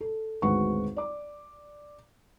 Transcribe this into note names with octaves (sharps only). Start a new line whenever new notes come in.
A4
G#1 D2 G#3 B4 F#5 C#6
D5 D6